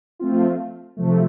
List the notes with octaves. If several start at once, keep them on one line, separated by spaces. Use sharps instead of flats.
F3 A3 C4 F4
C3 F3 A3